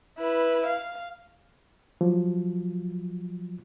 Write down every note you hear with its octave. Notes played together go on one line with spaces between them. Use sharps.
E4 B4
F5
F3 F#3 F4